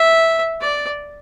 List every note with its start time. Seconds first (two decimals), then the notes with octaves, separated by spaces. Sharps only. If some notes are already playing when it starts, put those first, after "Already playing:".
Already playing: E5
0.61 D5